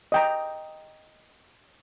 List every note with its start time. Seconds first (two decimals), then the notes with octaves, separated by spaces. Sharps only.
0.12 D#5 G5 A#5